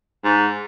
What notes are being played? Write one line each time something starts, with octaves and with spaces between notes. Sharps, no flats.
G#2